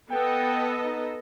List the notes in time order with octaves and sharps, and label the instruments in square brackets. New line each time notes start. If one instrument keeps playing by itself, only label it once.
[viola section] B3 A4 D#5 [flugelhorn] G5
[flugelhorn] D#4